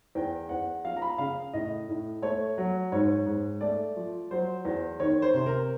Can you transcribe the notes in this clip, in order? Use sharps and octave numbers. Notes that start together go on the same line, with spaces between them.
E2 G5
E2 F#5
F3 F5
A#5
B5
C#3 F5
A2 D#5
A2
A3 C#5
F#3
G#2 C#5
G#2
A3 D5
F3
F#3 C5
E2
D#3 C#5
C5
C3
A#4